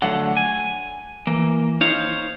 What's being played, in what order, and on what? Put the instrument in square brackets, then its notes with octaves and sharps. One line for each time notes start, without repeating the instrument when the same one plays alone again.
[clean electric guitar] D3 F#3 A3 [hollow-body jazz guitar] F#5
[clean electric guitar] G#5
[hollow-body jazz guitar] E3 [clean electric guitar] A#3
[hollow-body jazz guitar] D#4 [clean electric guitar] C5 C#5 F5